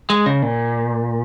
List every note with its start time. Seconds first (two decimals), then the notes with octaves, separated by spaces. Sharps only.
0.10 G#3
0.26 C#3
0.43 A#2